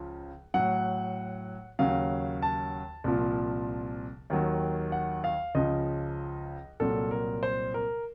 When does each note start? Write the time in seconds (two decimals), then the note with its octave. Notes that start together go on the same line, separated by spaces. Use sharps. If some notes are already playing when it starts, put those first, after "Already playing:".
Already playing: C#2 C#3 F3
0.54 A2 F#3 F#5
1.79 D#2 C#3 F#3 F5
2.42 A5
3.04 C2 A#2 F3
4.30 D#2 D#3 F#3
4.92 F#5
5.24 F5
5.55 C#2 C#3 F3 D#5
6.80 C2 A#2 F#3 A4
7.11 A#4
7.43 C5
7.74 A#4